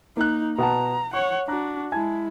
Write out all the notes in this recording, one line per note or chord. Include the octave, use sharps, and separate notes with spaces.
A#3 D#4 F#6
B2 F#5 A5 A#5
C#5 F#5 C#6
D4 F#4 A#5 F#6
G#3 E4 G#5 A5 G#6